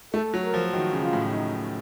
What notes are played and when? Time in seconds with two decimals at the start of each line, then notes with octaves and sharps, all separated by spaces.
0.14 A3 A4
0.34 F#3
0.43 A#4
0.54 F3
0.73 D#3 F#4
0.93 C#3
1.03 F4
1.13 A2
1.33 D#4